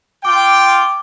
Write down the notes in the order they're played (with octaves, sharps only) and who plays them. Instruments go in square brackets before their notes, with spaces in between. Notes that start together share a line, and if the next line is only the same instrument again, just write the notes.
[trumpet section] F4 G5 [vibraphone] D6